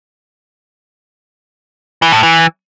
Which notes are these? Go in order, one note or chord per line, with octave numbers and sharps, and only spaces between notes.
E3
A2
E3